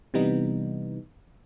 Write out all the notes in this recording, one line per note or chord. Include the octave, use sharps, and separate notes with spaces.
C3 E3 G3 B3 D#4